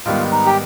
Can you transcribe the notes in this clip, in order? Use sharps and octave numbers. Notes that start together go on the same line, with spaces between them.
G#2 D#3 G3 B3 F4
D#4
G4